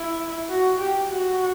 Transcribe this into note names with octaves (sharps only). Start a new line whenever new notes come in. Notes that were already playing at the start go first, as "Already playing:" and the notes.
Already playing: E4
F#4
G4
F#4